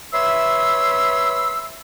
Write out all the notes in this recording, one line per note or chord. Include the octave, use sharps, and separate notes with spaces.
B4 C#5 E5 B5 C6 E6